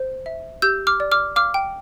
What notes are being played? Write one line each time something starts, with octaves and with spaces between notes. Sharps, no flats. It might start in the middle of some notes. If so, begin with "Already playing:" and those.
Already playing: C5
E5
G4 E6 G6
D6 F6
D5
D6 F6
F5 D6 F6
G5